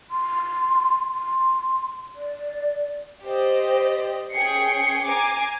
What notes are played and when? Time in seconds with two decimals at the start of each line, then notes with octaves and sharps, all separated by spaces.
0.11 C6
1.14 C6
2.16 D5
3.24 G4 C5 D5 D#5
4.32 C#4 G#4 G5 C7 C#7
5.08 G#5 A#5 D6 G#6 C7